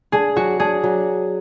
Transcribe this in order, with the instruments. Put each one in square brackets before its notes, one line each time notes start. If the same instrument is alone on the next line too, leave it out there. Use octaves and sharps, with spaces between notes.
[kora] D4 [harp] G#4
[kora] F#3 [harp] F#4
[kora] D4 [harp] G#4
[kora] F#3